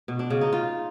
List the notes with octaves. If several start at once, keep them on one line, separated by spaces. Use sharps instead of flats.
B2
D4
C#3
D#4
F4